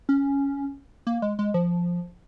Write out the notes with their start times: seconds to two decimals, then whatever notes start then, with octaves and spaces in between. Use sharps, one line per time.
0.09 C#4
1.07 A#3
1.22 G#3
1.39 G#3
1.54 F3